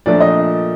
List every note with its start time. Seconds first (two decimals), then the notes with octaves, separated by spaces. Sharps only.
0.06 A#2 F3 A3 D4 D5
0.20 D#5